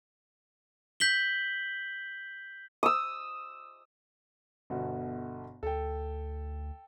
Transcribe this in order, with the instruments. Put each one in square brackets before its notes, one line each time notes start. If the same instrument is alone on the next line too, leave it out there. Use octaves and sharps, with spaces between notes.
[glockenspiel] G6 B6 F#7 G7
[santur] D#6 E6
[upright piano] G1 B2 F#4
[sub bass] D2 [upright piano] A4 G5